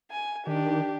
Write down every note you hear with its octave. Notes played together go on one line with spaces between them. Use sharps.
G#5
D#3 D4 G4